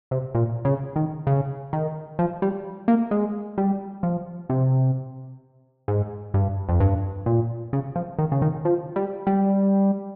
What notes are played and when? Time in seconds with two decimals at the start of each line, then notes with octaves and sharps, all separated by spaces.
0.11 C3
0.34 A#2
0.65 C#3
0.96 D#3
1.27 C#3
1.73 D#3
2.19 F3
2.42 G3
2.88 A#3
3.11 G#3
3.58 G3
4.03 F3
4.50 C3
5.88 G#2
6.34 G2
6.69 F2
6.80 G2
7.26 A#2
7.73 C#3
7.96 F3
8.19 D#3
8.32 C#3
8.42 D#3
8.65 F3
8.96 G3
9.27 G3